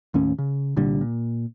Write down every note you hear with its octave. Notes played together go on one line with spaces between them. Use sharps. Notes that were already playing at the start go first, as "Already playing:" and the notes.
D#2 A2 C#4
C#3
C2 A#2 D3 G3
A#2